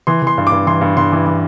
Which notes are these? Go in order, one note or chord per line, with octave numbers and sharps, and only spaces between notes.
E3 C6
E3 C6
G2
D6
G2
E3 C6
G2
G2 C6
E3
E3